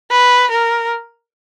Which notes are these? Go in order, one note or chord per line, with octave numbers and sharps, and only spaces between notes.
B4
A#4